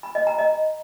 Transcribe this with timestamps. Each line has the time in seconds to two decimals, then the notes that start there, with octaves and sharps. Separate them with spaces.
0.03 B5
0.15 D#5
0.27 A#5
0.38 D#5